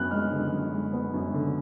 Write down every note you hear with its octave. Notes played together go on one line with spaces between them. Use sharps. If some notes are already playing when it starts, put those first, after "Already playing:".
Already playing: F#2 B3 F#6
G#3 F6
D3
F#2
G#3
B3
F#2
D3